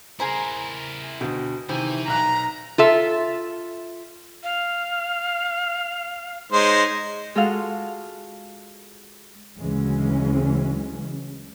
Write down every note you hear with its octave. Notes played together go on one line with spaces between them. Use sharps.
E4 G#4 A#4 C5 G#5 A#5
D2 B2 G5
C3 D#3 E3 E4 G5 G#5 B5
B1 A#5 F#6
F4 A4 E5
F5
G#3 D#4 C5 C#5
G#3 F4 F#4 A4 F5 F6
D2 C#3 E3 F#3 G#3 C#4